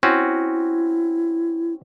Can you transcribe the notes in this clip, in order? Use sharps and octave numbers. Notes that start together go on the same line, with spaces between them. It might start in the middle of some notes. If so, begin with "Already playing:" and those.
C4 C#4 E4 F#4